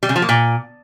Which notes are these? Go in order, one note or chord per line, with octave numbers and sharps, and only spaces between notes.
G3
C#3
F3
A#3
A#2